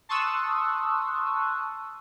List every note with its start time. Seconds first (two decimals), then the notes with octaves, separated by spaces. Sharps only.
0.09 A5 C6 C#6 D#6 E6 F#6